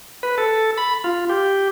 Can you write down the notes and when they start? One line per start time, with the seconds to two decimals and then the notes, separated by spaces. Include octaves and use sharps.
0.23 B4
0.38 A4
0.78 B5
1.04 F4
1.30 G4